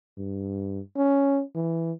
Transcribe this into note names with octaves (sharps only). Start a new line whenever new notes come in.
G2
C#4
E3